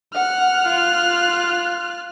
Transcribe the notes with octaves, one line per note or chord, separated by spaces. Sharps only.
F#5 F6 F#6
F4